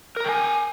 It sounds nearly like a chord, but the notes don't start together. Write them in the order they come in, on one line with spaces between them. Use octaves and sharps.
A#4 A#5 G5 G#5